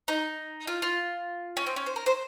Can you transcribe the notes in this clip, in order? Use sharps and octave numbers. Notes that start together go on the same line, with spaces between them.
D#4
F4
F4
C#4
C4
C#4
C5
A#4
C5